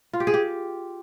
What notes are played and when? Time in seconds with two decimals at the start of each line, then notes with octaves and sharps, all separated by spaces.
0.13 F4
0.20 G4
0.27 G#4
0.34 G4